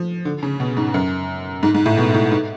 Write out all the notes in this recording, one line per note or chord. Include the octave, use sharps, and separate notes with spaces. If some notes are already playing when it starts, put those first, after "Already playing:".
Already playing: F3
D3
C#3
B2
G#2
F#2
G#2
G#2
A2
B2
A2
G#2